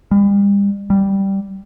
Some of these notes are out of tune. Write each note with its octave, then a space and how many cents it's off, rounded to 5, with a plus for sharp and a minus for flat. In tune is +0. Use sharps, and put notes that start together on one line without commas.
G3 +40
G3 -5